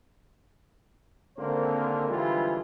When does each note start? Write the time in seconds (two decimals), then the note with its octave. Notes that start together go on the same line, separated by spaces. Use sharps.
1.37 G#1 D3 A#3 C4 A#4 C5
2.08 D3 E3 F3 G3 G#3 F4